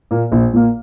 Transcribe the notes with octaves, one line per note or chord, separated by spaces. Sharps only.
A#2 A#3
A#1
A#2 A#3